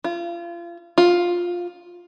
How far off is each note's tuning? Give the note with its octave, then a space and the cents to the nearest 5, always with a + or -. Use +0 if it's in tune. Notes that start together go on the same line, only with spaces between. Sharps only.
F4 -30
F4 +10